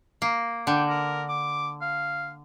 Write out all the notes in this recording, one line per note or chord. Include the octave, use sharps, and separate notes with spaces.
A#3
D3 G5
A#4
D6
F5